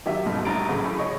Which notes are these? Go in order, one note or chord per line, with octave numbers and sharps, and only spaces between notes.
D#3 F#3 G4 E5
C#2 G#2 B2 G3 A3
A#1 G3 E4 A#5 A6 D7
A2 C#3 E3 F#3 A3
G#4 C#5 D#5 C#6